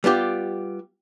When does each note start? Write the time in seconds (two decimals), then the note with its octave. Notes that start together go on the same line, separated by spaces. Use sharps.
0.04 G3 B3 F4 G4